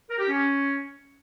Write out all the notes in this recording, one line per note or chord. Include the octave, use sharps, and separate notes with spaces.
A#4
G4
C#4